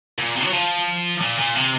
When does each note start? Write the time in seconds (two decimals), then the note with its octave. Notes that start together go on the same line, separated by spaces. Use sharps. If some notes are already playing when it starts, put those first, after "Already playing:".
0.18 A#2
0.36 C3
0.45 F#3
0.52 F3
1.21 A#2
1.38 A#2
1.55 C3